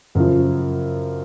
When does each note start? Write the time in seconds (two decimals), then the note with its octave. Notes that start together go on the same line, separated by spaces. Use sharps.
0.15 F#2 C#3 F3